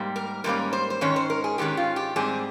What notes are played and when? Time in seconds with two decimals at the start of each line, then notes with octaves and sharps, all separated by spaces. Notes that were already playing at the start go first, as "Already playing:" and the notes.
Already playing: G#2 G3 A#3
0.16 A#4
0.44 G#2 G3 A#3 C#4 A#4
0.73 C5
0.90 C5
1.01 G#2 D#3 G#3 C#4 C#5
1.16 C5
1.30 A#4
1.44 G#4
1.58 G#2 D#3 G#3 C#4 G4
1.77 F4
1.96 G4
2.16 G#2 G3 C4 G#4